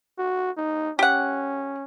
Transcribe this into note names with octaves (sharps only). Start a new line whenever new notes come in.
F#4
D#4
C#4 G4 F#5